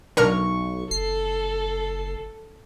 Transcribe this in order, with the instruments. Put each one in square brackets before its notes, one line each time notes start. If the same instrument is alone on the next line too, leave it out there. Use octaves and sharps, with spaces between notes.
[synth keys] B1 C#6 [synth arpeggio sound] D3 A#4 F6
[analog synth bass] F#1 [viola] A4 [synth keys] C7